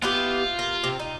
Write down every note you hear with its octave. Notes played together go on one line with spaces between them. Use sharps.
B3 E4 F4 G4
A#4
C3 C4
D#4